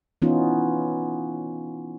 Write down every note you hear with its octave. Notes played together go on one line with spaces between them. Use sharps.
E3 B3 C#4 D#4 F4